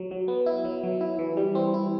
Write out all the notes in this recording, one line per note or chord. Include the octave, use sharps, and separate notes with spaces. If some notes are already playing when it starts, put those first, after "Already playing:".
Already playing: F#3
F#3
B3
E4
F#3
F#3
E4
E3
G3
C4
E4